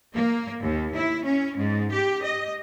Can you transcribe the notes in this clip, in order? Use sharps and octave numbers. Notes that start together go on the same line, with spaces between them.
A#3
D#2
E4
C#4
G#2
G4
D#5